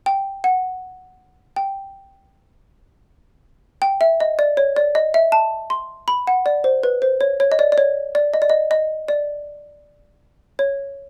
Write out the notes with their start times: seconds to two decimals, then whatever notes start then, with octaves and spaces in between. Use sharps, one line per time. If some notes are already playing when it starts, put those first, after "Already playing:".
0.06 G5
0.44 F#5
1.56 G5
3.82 G5
4.01 E5
4.20 D#5
4.39 D5
4.57 C#5
4.76 D5
4.95 D#5
5.14 E5
5.32 A5
5.70 C6
6.08 B5
6.27 F#5
6.46 D5
6.64 C5
6.83 B4
7.02 C5
7.21 C#5
7.40 C#5
7.52 D#5
7.59 D5
7.72 D5
7.78 C#5
8.15 D5
8.34 D#5
8.42 D5
8.50 D#5
8.71 D#5
9.08 D5
10.59 C#5